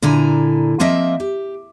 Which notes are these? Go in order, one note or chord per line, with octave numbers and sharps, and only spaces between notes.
A#2 D3 E4 G#5 A#5
F3 A#3 C4 D#5 E5
G4